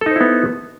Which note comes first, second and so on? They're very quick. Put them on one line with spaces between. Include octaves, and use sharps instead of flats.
A4 D#4 C5 E4 B3